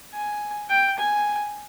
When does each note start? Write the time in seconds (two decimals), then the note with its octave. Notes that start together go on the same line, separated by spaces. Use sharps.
0.14 G#5
0.69 G5
0.98 G#5